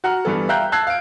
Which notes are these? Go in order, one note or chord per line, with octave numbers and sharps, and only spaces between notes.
F#4 F#5 A#5 F6
G2 E3 B3 A4
E5 F5 G5 A#5 F#6 G6
A5 E6 F#6 G#6 C7
F5 D7